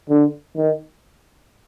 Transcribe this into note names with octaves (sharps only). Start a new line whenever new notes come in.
D3
D#3